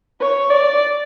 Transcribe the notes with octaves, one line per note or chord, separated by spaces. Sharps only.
C#5
D5